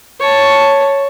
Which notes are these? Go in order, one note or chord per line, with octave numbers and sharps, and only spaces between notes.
C#5 A5